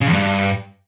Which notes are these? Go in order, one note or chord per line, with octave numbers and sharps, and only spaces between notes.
C#3
E2
G2